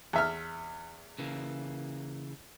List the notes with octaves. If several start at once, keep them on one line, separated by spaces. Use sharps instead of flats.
E2 E5 F6
C#3 E3 A#3